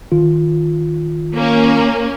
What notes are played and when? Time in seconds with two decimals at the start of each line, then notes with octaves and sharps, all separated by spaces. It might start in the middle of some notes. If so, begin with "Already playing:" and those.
0.12 D#3 F4
1.33 A#3 C#4